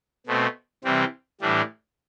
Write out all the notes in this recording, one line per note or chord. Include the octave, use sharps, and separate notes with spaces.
B2 A3 C4
C3 E3 G3 C4
A2 E3 G3 D4